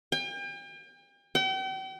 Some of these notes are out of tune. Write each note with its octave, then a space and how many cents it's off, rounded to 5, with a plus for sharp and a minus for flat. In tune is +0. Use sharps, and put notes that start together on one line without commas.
G5 +40
G5 -40